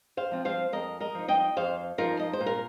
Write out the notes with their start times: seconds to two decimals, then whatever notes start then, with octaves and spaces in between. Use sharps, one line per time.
0.17 C5 F5
0.31 F3 C4 F4
0.45 C5 F5
0.73 F2 A#4 D#5
1.00 A#4 D#5
1.15 F3 D#4
1.28 D#5 G5
1.57 F2 C5 F5
1.98 F3 D#4 F4 A#4
2.19 D#5
2.33 C5
2.40 A#2
2.46 A#4